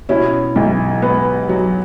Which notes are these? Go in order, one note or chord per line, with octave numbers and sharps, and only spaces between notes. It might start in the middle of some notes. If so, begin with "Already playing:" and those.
B2 C#4 E4
B1
B3
F#3